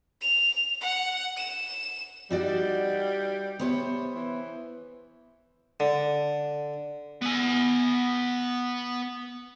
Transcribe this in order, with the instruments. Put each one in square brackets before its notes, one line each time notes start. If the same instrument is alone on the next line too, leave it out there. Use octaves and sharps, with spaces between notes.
[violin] F7
F#5
E7
[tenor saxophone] G3 [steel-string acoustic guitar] D#4 F#4 D5
[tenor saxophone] C3 [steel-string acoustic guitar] B3 C5 C#5
[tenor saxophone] E3
[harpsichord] D3
[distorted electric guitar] B3 G#5